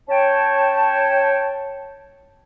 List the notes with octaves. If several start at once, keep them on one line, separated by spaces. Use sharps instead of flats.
C#4 C#5 G5 A5